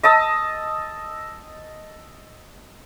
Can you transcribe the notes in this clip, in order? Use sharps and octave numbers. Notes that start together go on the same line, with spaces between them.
D#5 A5 D#6 E6